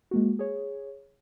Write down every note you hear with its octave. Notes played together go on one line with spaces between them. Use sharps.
G#3 A#3 F#4
G#4 C#5